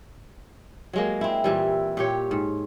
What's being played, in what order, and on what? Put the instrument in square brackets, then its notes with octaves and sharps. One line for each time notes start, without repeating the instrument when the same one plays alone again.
[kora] F#3 G#3 A#3
C4 E4
A#2 E3 G3
A#2 G4 C#5
G#2